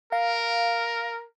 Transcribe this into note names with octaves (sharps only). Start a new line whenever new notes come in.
A#4 F5